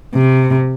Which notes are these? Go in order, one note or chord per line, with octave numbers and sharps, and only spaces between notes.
C3